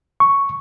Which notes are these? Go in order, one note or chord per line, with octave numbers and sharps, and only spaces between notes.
C#6